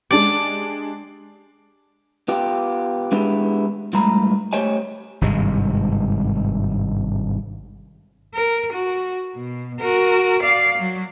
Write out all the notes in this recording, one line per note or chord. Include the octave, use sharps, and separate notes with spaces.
G#3 D4 G4 D5
B3 F4 G4
G#3 B3 D4 E4 G4 G#4
G2 F3 G#3 A3 A#5 B5
A3 G4 C5 C#5 D#5 G#5
G#1 G2 C3 G#3
A#4
F#4
B2
F#4 A#4
D5 F5
F#3